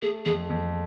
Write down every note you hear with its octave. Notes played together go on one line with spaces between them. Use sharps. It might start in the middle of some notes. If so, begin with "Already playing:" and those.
A3 G#4
F2 G#4
F2